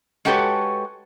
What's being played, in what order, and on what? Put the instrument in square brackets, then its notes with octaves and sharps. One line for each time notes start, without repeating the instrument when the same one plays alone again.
[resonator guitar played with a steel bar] G#3 F#4 G4 A4 B4 C#5